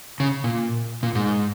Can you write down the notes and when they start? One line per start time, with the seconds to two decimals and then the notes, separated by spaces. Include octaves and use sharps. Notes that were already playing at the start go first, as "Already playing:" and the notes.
0.20 C#3
0.44 A#2
1.03 A#2
1.15 G#2